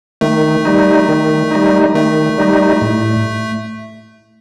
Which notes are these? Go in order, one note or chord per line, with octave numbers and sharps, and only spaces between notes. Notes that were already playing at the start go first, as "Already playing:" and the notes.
D#3 A3
G3 D#4
D#3
G3 D#4
D#3 A3
G3 D#4
A2